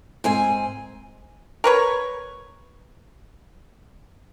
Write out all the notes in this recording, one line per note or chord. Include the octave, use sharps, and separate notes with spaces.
G#2 C4 G#5
A#4 B4 C#5